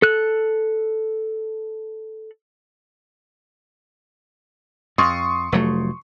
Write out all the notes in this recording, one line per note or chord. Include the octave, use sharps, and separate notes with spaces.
A4 F#6
F2 C6 C#6 D#6
F1 F#3 A3